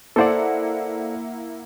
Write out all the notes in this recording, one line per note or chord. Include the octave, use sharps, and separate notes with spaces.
A#3 E4 A4 C5 D5 F#5